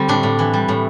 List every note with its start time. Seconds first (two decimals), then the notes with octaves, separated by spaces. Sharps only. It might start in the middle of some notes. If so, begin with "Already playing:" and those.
Already playing: D3 G3 C4
0.08 A2 D4
0.23 A2
0.39 E3
0.53 G3
0.68 A2